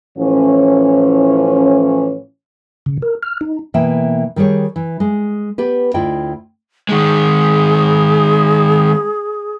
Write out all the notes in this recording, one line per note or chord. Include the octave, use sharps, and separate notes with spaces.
A2 E3 F3 C#4
C#3
A#4
F6
D#4
B2 E3 A#3 E5 G5
D#3 G3 G4 G#4 C#5
E3
G#3
B3 G4 B4
D2 E4 F4 D5 D#5 G5
D#3 G#3 G#4